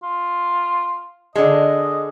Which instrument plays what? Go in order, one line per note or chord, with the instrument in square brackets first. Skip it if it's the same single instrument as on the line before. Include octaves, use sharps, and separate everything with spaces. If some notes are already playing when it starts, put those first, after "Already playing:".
[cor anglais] F4
[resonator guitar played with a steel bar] D3 G#3 [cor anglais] D#5